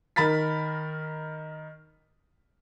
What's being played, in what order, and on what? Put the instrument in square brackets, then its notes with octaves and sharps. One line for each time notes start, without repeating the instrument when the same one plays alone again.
[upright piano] D#3 A#4 B5 A6 B6